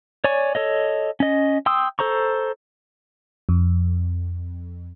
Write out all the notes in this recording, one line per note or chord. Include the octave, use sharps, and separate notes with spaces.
C#5 D5 G#5 C#6
A4 C#5 D#5
C#4 D#5
G5 C6 D#6 E6
A4 C5 A#5 C#6
F2